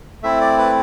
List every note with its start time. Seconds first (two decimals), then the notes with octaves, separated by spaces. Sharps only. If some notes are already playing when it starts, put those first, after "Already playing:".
0.23 A3 C4 E4 E5
0.41 D5
0.58 B4